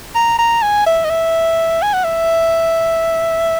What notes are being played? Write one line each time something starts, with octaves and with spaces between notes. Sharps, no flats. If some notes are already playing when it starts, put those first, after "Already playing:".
A#5
A#5
G#5
E5
D#5
E5
G#5
F#5
E5